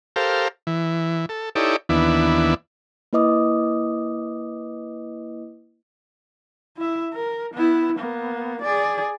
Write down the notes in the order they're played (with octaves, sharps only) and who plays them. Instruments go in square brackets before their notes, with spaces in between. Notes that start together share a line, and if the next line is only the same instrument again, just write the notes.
[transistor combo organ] G4 A4 A#4 C5 F5
E3
A4
D#4 E4 G4 A4 C#5 D5
D#2 E3 B3 D4 E4
[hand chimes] A#3 E4 B4 D#5 D6 D#6
[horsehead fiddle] E4 E5
A#4
B3 E4
A#3 B3
G#4 D5